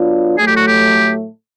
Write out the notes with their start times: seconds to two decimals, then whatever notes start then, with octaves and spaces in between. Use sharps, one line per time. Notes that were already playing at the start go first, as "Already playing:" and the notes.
Already playing: F#3 B3 D4 F4
0.38 A2 F#3 A3 G#4
0.47 G4
0.56 F#4
0.67 G4